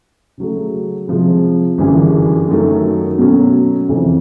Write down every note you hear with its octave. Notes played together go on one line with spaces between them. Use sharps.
C#3 F#3 A3
C3 F3 G#3
G1 F#2 C#3 E3 G3
F#2 D#3 F#3 A3 C#4
B2 F#3 A3 C#4
F2 C3 E3